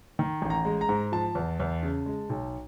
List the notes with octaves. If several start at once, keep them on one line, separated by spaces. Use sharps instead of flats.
D#3
A1
A#5
G#3
A#5
G#2
F3 A5
E2
E2
C#3
G#3
B1